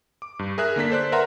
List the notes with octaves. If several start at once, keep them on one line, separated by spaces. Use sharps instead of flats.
D6
G2
G#4 A#4 E5 F#6
D3 A#3 D4 B6
A4 C5 D5 F#6
A#4 B4 E5 F#5 A#5 C6